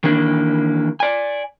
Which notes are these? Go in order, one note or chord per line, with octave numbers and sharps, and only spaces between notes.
D#3 E3 A#3 D4
D5 G#5